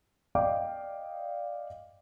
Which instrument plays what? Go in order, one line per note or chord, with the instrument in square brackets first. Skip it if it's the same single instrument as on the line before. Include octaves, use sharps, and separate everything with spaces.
[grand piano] D5 D#5 F5 G5 D6